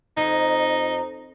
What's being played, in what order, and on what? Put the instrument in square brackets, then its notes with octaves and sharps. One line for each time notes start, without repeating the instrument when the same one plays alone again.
[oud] F2 [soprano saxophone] D#4